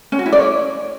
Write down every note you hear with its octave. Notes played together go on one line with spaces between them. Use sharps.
C#4
F#4
E4
D5
C#5